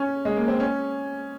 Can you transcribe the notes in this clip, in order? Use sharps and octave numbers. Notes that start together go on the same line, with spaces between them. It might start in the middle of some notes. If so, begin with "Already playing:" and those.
Already playing: C#4
G#3
A#3
C4
C#4